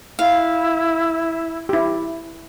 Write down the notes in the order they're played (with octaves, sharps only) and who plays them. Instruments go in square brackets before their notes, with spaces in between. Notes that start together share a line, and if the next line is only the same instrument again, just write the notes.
[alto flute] E4 [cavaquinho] F5
[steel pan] E4 G4